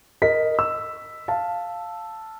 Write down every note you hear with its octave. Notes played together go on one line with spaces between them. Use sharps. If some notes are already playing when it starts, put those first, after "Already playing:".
A#4 D#5 B6
E6
F5 A5